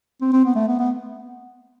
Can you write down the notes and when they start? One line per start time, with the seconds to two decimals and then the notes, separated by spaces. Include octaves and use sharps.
0.22 C4
0.33 C4
0.45 B3
0.55 A3
0.68 B3
0.79 B3